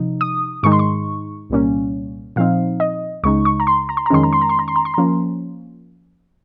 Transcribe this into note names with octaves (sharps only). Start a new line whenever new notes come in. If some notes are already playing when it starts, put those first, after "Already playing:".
Already playing: C3 F3 D#4
D#6
G#2 D#3 G#3 D#4 C#6
C6
C#6
C2 A#2 G3 A#3 C#4
A#2 F3 C4 D#4 F5
D#5
C#2 C#3 G#3 D#4 C#6
C#6
A#5
C6
A#5
C6
A#5
F2 D#3 G#3 C#4 C6
A#5
C6
A#5
C6
A#5
C6
A#5
C6
A#5
F3 A#3 C#4